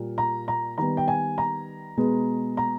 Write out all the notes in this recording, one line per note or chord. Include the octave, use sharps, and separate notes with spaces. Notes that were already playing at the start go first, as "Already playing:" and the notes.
Already playing: A#2 G3 A#3
A#5
A#5
D#3 G3 B3 A#5
G5
G#5
A#5
B2 G#3 B3
A#5